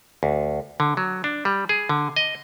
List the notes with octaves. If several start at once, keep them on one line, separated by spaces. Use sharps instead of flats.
D2
D3
F#3
D4
G3
G#4
D3
D#5